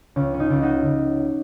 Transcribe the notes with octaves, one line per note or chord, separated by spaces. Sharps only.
C#2 C#4
C#4
D#4
C#2
D#4 F#4
C#2